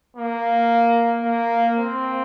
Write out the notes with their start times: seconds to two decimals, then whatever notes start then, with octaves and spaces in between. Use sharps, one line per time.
0.17 A#3
1.23 A#3
1.77 C4